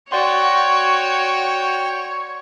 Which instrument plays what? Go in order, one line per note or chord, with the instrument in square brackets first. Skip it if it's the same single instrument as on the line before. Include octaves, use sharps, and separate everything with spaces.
[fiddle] F#4 [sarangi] C#5 [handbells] D5 F#5 C6 [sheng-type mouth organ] G5